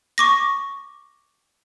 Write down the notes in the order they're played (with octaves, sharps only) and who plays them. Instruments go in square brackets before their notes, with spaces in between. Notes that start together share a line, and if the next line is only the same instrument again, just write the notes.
[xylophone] C#6 D6 A#6